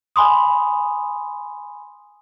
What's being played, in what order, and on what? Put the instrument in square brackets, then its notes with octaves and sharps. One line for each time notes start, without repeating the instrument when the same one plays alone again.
[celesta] G#5 B5 C6 D#6